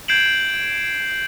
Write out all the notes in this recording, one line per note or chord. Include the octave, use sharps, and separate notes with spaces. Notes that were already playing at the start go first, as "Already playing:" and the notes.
G6 G#6 C7 D7 E7 F#7